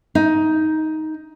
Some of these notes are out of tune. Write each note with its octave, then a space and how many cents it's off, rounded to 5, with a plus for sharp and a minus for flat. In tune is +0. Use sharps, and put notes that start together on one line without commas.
D#4 +10